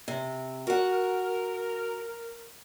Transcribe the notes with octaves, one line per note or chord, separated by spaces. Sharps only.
C3
F#4 A#4 F#5